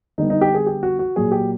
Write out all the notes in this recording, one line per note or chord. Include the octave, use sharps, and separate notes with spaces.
D3 G3 B3 D#4
D#4
G4
G#4
G4
F#4
F#4
A#2 F#3 A#3 G#4
G4